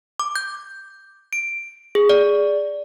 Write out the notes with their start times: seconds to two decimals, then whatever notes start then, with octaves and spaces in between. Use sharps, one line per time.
0.20 D6
0.36 G6
1.33 D7
1.95 G#4
2.09 D5